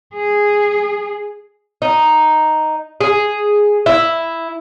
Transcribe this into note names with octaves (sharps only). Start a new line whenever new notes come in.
G#4
D#4
G#4
E4